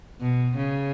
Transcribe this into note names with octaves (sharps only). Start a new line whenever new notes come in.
B2
C#3